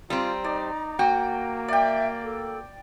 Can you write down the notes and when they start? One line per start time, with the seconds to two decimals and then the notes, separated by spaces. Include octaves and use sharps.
0.10 G3 C4 F4 A#5
0.44 D#4 D5
0.99 A#3 F#4 G5
1.68 D5 E5 G5
2.24 A4